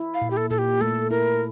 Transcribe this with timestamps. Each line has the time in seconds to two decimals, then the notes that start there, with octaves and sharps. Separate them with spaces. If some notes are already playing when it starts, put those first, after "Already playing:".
Already playing: E4
0.14 F5
0.22 A#2
0.31 G4
0.37 A4
0.50 A#2 A4
0.58 G4
0.81 A3 A4
1.11 E4 A#4